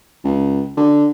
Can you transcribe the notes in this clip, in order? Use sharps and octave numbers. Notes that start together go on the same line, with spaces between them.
C#2
D3